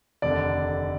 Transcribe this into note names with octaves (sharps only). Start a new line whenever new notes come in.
F1 D#2 D3 D5